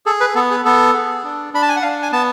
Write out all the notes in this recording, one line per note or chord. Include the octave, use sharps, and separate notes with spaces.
G#4 A4
B4
B3 A4
G#4
B3 A4
G#4
D4
D4 B5
A5
G#5
F#5
D4 F5
G#5
B3 A5